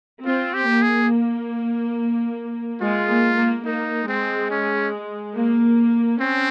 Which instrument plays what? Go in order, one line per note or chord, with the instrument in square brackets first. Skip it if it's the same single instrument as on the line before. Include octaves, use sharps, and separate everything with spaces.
[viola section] C4 [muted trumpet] F4
[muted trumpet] G4
[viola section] A#3
[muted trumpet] G#4
[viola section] G#3 [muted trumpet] F4
[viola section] A#3
A#3
[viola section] A#3 [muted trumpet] D#4
[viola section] G#3 [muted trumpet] C4
[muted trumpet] C#4
[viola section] A#3
[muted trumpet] C4 [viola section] C#4